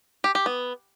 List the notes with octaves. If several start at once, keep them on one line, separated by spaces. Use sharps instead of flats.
G4
G4
B3